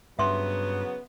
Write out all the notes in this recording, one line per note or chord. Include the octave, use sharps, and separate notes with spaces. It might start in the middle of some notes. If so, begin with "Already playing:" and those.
G2 C#3 F#3 B3 E5 C6